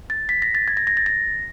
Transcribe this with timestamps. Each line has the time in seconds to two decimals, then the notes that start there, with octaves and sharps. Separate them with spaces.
0.10 A6
0.29 B6
0.42 A#6
0.55 A6
0.68 G#6
0.77 A#6
0.87 A#6
0.97 A6
1.06 A#6